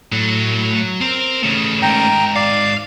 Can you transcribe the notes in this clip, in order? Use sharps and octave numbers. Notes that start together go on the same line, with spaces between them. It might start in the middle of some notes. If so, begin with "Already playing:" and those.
A2 F#3 A3
C4 A#4
C#3 A3 C#4
G#2 A#4 G5 A#5
D5 F5